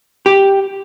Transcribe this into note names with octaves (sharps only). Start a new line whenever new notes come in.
G4